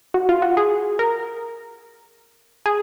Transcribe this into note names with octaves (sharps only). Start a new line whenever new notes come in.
F#4
F4
F#4
G#4
A#4
G#4